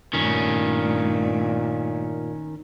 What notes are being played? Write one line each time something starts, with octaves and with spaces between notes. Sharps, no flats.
G2 A#2 D#3 A3 C#4